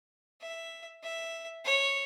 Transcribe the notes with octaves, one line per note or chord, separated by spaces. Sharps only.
E5
E5
C#5